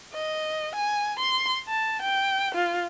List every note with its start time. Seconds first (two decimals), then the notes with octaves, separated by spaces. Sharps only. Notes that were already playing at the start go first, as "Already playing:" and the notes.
0.14 D#5
0.75 G#5
1.19 C6
1.68 A5
2.02 G5
2.55 F4